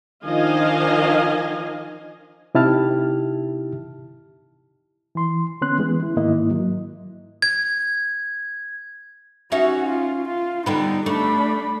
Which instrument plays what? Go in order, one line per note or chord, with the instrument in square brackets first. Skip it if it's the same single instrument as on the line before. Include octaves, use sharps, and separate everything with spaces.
[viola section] D#3 F3 D4 D#5 F5 G#5
[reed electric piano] C3 D#4 E4 G4 A5 F6
E3 C6
D3 B3 C#4 C6 F#6
E3 G#3 B3
E4
G#2 D#3 A#3 E4 D#5
F#3
[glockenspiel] G#6
[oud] C#4 D#4 E5 [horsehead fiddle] F#4
[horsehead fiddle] F4
F4
[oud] D3 G3 B3 [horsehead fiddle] D#4
[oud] A3 [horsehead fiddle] D4 B5